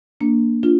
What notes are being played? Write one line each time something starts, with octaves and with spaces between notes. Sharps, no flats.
A#3 D4
D4 F4